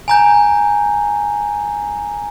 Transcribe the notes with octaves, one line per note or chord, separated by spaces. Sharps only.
G#5 A#5 G6